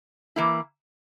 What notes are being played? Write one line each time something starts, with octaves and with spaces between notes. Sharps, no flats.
E3 A#3 E4